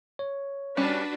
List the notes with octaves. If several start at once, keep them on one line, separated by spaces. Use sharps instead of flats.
C#5
G3 C#4 D4 F#4 B4